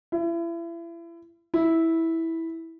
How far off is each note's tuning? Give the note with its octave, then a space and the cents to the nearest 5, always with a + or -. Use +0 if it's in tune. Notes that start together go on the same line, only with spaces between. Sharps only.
E4 +35
E4 -10